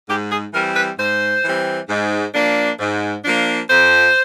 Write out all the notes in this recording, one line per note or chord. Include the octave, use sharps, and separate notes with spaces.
G#2 G4
G#4
E3 G3 C4 A#4
B4
G#2 C5
E3 G3 C4
G#2
F3 A#3 D4
G#2
F3 A#3 D4
F2 C5